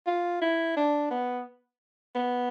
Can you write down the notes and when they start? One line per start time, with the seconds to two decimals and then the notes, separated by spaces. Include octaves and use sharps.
0.07 F4
0.41 E4
0.77 D4
1.11 B3
2.15 B3